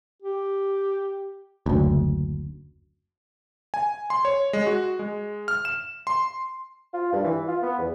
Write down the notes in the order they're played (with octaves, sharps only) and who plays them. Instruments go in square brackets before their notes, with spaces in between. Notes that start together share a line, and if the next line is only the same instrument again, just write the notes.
[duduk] G4
[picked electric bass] F#1 D2
[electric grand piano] G#5
C6
C#5
G#3
F#4
G#3
F6
E7
C6
[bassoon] F4
G2
E3
F4
B3
E2